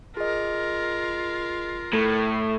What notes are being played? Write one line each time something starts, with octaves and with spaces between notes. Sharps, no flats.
F4 G#4 A#4 D#5
A2 A4